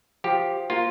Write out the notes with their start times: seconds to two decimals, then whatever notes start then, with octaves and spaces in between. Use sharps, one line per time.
0.24 F3 G4
0.70 A#3 F4